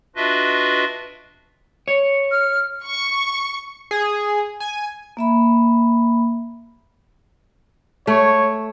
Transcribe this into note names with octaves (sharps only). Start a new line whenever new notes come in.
D4 F4 F#4 B4 D#5 E5
C#5
F6
C#6
G#4
G#5
A#3 E5 B5
A3 C#5